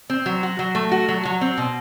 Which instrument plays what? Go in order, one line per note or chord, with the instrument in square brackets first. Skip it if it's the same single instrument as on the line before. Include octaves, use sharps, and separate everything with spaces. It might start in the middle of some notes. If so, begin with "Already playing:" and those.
[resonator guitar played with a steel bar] C4
F#3
F#4
F#3
A3
F#4
F#3
F#3
C4
B2